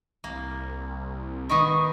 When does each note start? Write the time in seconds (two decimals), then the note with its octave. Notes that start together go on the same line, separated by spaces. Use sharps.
0.24 C2 A#3
1.50 D#3 B3 D#4 C#6